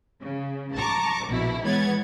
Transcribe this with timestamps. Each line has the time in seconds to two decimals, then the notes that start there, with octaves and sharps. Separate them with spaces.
0.22 C#3
0.75 A5 A#5 C#6 D6
1.27 A#1 B2 E4
1.63 E3 G#3 B3 C#5 G#6 A6